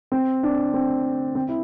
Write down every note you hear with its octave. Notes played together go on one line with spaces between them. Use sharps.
C4
D4
C4
C4
E4